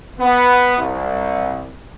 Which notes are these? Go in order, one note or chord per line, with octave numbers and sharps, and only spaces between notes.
B3
C2